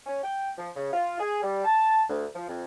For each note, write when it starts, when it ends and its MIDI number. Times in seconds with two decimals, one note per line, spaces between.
0.07 0.21 61
0.24 0.50 79
0.58 0.70 53
0.76 0.92 49
0.93 1.18 65
1.20 1.39 68
1.42 1.64 55
1.65 2.03 81
2.10 2.25 38
2.35 2.45 53
2.48 2.64 41